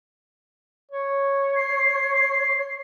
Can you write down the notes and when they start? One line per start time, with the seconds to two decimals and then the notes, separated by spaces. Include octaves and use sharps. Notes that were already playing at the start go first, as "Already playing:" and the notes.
0.91 C#5
1.56 C7